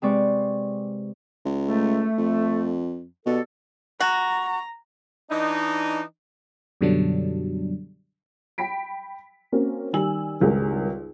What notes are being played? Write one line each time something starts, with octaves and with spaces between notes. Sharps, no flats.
C3 G#3 C4 B4 D5 C#6
C#2
A3
F2
B2 D4 G4 A4
F#4 A#5
E3 D4 D#4
F#2 B2 D3 F#3 G3 D4
G5 B5 B6 D7
A#3 C4 C#4 F#4 A#4
D#3 G3 G#5 E6 F#7
G#1 C#2 G2 G#4 A#4